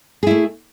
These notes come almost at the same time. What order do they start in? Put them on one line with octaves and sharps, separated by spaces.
G#4 E4 A3